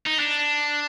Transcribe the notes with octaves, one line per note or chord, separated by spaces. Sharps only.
D#4
D4